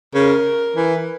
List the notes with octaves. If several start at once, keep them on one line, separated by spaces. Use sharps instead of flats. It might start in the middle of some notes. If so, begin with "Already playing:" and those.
C#3 A#4
E3